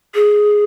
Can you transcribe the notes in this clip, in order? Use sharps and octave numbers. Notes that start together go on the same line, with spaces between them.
G#4